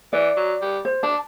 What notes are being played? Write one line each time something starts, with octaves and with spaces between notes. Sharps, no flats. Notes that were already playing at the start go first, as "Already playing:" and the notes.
E3 D5
F#3
G3
C5
D4 A5